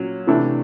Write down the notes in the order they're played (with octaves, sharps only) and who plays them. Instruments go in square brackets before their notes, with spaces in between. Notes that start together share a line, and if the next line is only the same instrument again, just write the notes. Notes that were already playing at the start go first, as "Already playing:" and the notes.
Already playing: [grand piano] A#2 F#3 C#4
C3 E3 A3 D4